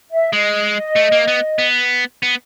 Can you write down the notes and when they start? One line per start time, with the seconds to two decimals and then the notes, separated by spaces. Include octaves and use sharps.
0.11 E5
0.32 G#3 D#5
0.96 A3
1.12 A#3
1.28 B3
1.59 B3
2.23 B3